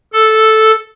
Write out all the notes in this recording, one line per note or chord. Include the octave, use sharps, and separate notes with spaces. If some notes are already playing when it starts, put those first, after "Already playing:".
A4